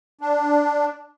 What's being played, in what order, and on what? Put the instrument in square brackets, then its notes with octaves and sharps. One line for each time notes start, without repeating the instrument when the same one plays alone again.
[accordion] D4